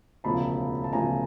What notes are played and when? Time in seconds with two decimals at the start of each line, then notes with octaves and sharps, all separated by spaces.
0.24 E1 D2 C#3 F3 A5 B5
0.84 A5
0.92 E1 D2 C#3 F3 G#5 A#5